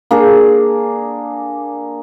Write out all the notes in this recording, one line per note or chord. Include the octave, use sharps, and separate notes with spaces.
A#3 D4 G#4